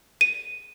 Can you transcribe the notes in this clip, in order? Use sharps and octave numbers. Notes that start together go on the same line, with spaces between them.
D#7